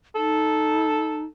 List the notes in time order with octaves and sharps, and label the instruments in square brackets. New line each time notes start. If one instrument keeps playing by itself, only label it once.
[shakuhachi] D#4 [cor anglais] A4